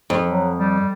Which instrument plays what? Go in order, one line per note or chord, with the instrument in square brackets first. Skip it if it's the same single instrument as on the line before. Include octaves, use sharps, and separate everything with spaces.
[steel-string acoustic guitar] F2
[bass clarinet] F#3
G3